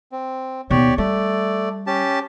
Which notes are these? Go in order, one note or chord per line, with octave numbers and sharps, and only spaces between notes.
C4
D#2 B2 G4 C#5 D5
G3 A3 D5
C#4 G4 A5